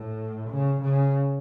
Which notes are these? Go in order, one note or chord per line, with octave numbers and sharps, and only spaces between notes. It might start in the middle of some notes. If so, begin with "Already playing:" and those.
Already playing: A2
C#3
C#3